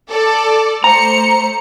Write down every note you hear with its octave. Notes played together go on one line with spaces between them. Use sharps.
A4 D5
A3 C5 A#5 C#7